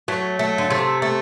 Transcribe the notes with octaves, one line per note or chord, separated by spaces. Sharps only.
F#3 A3
A3
D3
C3 A3
A3